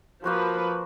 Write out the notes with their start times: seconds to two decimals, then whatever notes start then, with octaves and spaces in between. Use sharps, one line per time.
0.24 F3 A#3 F#4 B4 C5